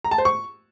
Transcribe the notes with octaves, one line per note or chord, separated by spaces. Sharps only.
A#5
A5
C5
C#6